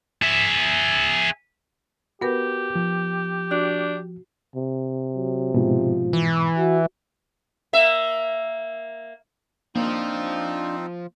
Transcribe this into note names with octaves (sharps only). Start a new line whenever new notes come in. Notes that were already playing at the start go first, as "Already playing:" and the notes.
G#4 E5
B3 F#4 G4 A#4 B4
F3
D4 F#4
C3
F#3
G#2 B2 F3
E3
F#4
A#3 E5
F3 A#3 C4 D4 D#4 F4